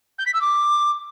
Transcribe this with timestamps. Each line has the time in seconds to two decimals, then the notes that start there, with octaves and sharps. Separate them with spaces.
0.18 G6
0.26 B6
0.33 E6
0.41 D6